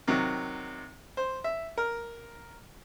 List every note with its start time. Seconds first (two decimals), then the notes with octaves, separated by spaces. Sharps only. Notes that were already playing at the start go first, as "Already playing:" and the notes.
0.07 C3 D#3 F#3
1.17 C5
1.44 E5
1.78 A#4